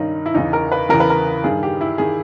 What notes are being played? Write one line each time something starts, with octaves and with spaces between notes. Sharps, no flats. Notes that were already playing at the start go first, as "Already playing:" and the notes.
Already playing: G2 D#3 C#4 D#4
E4
E2 C#3 E3 D#4
A#4
B4
E2 C#3 E3 A#4
B4
A#4
G2 D#3 G#4
G4
E4
D#3 G#4